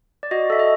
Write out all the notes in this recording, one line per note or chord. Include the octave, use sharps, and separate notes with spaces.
D5
F#4 D#5
A4 E5
D#5